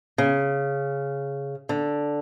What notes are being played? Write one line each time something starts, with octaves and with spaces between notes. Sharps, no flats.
C#3
D3